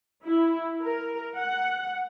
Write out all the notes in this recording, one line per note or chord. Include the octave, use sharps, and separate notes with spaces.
E4
A#4
F#5